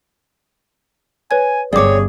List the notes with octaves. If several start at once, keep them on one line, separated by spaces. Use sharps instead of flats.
B4 C#5 G#5 G#6
G1 G2 C4 G#4 C#5 D5 D6